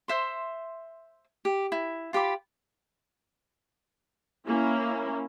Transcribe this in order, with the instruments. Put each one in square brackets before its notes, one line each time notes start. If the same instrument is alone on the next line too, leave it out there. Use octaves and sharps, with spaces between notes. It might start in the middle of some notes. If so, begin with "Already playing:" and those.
[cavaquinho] C5 E5 C6
G4
E4
F4 G4 B5 D6
[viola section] A#3 C#4 E4